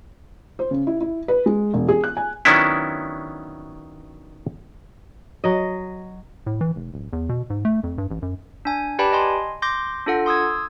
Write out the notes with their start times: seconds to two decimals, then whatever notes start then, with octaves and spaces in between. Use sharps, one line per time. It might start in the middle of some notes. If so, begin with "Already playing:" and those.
0.59 C5
0.71 C#3
0.87 E4
1.01 E4
1.28 B4
1.46 G#3
1.73 E1
1.89 G#4
2.04 F#6
2.17 G#5
2.45 D#3 F#3 B3 C#4 D4 E4
5.44 F#3 D#5
6.46 A2
6.61 E3
6.76 F1
6.94 D1
7.13 E2
7.29 B2
7.50 G#2
7.65 A3
7.84 F2
7.98 G2
8.11 A1
8.22 F#2
8.65 D4 G#5
8.99 G4 B4 D5 G5 A5 B5
9.12 D#5 G#5 C6
9.62 C6 D6 G6 A#6
10.06 D4 F4 A4 F#5
10.26 C6 D#6 E6 G#6